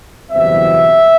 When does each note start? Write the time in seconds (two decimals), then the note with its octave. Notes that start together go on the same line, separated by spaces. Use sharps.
0.31 F#1 E2 B2 G3 C4 E5